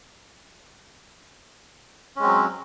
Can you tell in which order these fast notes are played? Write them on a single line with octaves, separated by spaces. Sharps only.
C#4 G#3 C4 F#3